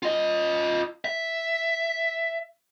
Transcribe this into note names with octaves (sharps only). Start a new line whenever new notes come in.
F4 D#5
E5